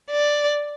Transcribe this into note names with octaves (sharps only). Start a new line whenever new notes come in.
D5